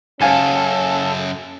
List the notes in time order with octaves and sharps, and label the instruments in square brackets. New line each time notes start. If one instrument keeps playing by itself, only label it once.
[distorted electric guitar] F#2 C#3 [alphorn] C#4 [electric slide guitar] A4 [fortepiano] F5 G#5 A5